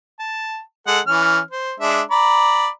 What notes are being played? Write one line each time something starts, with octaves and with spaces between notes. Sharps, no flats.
A5
G#3 A4 F#5
E3 C#4 F6
C5
G#3 D4 E5
D5 A#5 B5